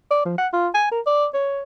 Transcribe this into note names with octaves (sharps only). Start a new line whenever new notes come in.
D5
F3
F#5
F4
G#5
A#4
D5
C#5